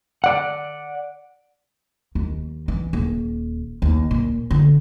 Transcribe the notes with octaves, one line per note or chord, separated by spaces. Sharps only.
D5 F#5
D#2
E3
D#1
D#2
A#2
D3